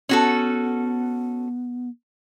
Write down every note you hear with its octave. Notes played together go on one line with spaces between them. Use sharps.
B3 C#4 F#4 A4